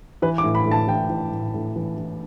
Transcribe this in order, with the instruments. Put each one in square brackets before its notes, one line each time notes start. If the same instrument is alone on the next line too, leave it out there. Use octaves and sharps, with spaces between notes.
[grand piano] E3 B4
D6
A2
B5
A2
A5
E3 G5
E3
A2
A2
E3
E3